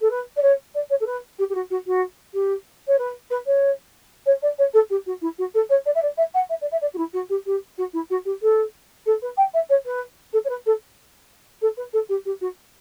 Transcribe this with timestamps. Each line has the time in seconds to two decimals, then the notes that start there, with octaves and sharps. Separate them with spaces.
0.01 A4
0.11 B4
0.37 D5
0.42 C#5
0.75 D5
0.90 C#5
1.00 A4
1.06 B4
1.39 G4
1.50 G4
1.55 F#4
1.71 F#4
1.87 F#4
2.34 G4
2.87 C#5
2.99 B4
3.31 B4
3.46 C#5
4.26 C#5
4.42 D5
4.59 C#5
4.74 A4
4.90 G4
5.06 F#4
5.22 E4
5.38 F#4
5.54 A4
5.70 C#5
5.86 D5
5.95 E5
6.02 D5
6.18 E5
6.34 F#5
6.49 E5
6.61 D5
6.72 E5
6.82 D5
6.94 F#4
6.98 E4
7.13 F#4
7.30 G4
7.46 G4
7.78 F#4
7.93 E4
8.10 F#4
8.25 G4
8.42 A4
9.06 A4
9.22 B4
9.37 G5
9.54 E5
9.70 C#5
9.86 B4
10.33 A4
10.45 C#5
10.49 B4
10.66 A4
11.62 A4
11.77 B4
11.93 A4
12.09 G4
12.26 G4
12.41 F#4